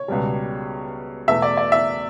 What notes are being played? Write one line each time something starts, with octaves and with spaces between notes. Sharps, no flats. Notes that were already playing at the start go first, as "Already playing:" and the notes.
Already playing: C#5
C#2 B2 G3
E2 B2 A3 E5
D5
D5
E5